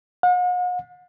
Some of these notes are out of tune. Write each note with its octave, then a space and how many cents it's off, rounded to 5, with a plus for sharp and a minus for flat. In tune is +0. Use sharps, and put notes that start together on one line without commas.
F#5 -45